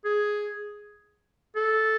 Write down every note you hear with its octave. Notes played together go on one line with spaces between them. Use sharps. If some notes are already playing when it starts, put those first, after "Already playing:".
G#4
A4